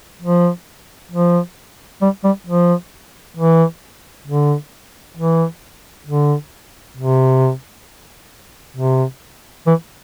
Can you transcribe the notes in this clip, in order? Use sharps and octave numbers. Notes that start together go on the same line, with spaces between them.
F3
F3
G3
G3
F3
E3
D3
E3
D3
C3
C3
E3